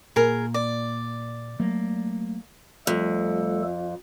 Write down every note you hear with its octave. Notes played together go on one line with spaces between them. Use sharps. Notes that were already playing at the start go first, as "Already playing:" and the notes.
A#2 A#3 G#4 A#4
D5
F#3 A3 A#3
F2 G3 A3 A4